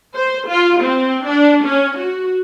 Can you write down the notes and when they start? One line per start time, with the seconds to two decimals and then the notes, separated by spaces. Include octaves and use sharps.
0.15 C5
0.49 F4
0.82 C4
1.28 D4
1.66 C#4
1.99 F#4